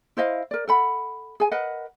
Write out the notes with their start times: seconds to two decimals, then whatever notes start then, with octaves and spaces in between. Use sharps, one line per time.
0.17 E4 C5 D#5 F5
0.51 A#4 D5
0.68 A4 F#5 B5
1.40 G#4 G#5
1.52 A#4 B4 D#5 F#5